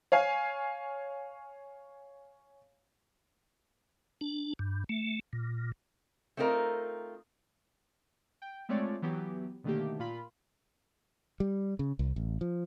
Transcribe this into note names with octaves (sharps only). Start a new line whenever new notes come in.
C#5 F5 G#5
D4
G2
A3
A#2
A3 C4 D#4 F4 A#4
G5
G#3 A3 C4 F4 C#5 D5
E3 F#3 B3 G4
B2 D3 D#3 A3 A#3 G4
A#2 F4 B5
G3
C#3
C2
A1
F3